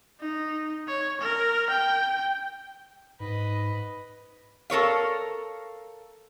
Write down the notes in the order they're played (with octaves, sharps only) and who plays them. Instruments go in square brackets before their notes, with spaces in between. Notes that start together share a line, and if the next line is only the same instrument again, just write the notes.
[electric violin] D#4
C#5
A#4
G5
[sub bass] G#2 [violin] B4 D#5
[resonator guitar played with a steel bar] A4 A#4 C#5 F5